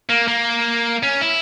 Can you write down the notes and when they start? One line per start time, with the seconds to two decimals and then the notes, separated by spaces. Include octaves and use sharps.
0.09 A#3
0.28 A#3
1.03 C#4
1.21 E4